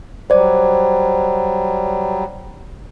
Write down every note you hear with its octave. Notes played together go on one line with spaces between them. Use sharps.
F#3 G3 C5 D5